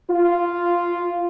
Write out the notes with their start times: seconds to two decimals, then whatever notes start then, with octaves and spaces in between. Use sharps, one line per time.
0.11 F4